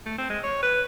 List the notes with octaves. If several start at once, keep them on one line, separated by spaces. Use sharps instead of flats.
A3
C4
G#3
C#5
B4